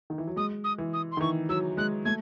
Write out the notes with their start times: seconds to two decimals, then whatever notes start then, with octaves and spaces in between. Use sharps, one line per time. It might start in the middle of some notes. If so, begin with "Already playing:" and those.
0.10 D#3
0.18 E3
0.27 F#3
0.36 G#3 D#6
0.64 D#6
0.78 E3
0.93 D#6
1.12 C6
1.17 D#3
1.20 E3 C#6
1.49 F#3 E6
1.77 G#3 F#6
2.05 A3 G#6